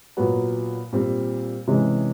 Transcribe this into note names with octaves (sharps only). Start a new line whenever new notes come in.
A#2 F#3 B3
A#2 G3 C4
C3 E3 G#3 C#4